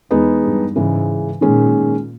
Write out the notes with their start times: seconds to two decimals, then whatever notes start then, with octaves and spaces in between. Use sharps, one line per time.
0.11 E2 G#3 B3 D#4
0.44 G2
0.76 G#2 C#3 E3 G#3
1.41 A#2 D#3 G#3 C#4